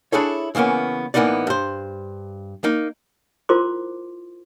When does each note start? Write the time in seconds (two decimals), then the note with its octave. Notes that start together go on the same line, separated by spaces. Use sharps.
0.12 D4 E4 G#4 A4 C#5
0.55 C#3 E3 A#3 B3 C#4
1.14 A2 E3 A#3 B3 D#4 D5
1.47 G2 C5
2.64 A#3 D#4
3.49 E4 F4 A#4 C5 C6 D6